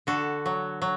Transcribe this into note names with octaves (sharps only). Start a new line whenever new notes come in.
D3 F#4 A4
F#3
F#3